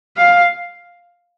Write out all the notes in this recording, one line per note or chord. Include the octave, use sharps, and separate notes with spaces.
F5